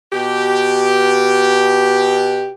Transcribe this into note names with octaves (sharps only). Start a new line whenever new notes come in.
B2 G4